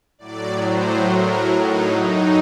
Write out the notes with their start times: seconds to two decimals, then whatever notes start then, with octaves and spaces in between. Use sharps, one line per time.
0.18 A2 F#3 D5
0.64 C5
1.09 A#4
1.55 D#4
1.99 F#2 F#3 D#4